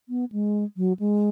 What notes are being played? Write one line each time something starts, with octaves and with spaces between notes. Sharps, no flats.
B3
G#3
F#3
G#3